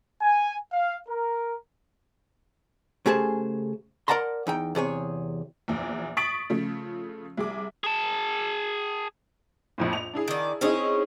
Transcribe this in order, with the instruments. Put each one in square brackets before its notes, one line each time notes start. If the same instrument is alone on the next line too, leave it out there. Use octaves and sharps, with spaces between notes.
[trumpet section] G#5
F5
A#4
[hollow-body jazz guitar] C#3 A3 G4 G#4 C5 A5
A#4 D5 F#5 A5 A#5 C6
E2 D#4 G5
E2 C3 G#4 C#5
[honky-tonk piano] A#1 E2
C#6 D#6 A6 B6 D7 F#7
C#3 F3 A3
C2 G#4 D6
[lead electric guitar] G#4 A5
[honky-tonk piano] A#1 F2 A2
F7
D4 E4 G#4
[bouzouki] D#3 D5
[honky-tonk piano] C4 D#4 E4 [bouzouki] C#4 G#4 C#5